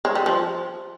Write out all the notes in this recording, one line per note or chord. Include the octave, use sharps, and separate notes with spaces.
G#3
G3
F3